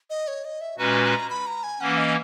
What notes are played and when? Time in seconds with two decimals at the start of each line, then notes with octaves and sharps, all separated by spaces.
0.10 D#5
0.28 C#5
0.45 D#5
0.61 E5
0.78 A#2 G#3 C#4 F#4 B4 A#5
1.04 A#5
1.30 B5
1.46 A#5
1.63 G#5
1.80 E3 A#3 C#4 F#5
1.97 D#5